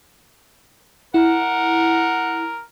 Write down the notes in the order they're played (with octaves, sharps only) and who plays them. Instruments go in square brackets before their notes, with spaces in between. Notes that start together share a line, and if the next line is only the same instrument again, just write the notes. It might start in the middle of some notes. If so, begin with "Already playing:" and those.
[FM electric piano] E4 [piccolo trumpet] A#4 [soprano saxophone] F#5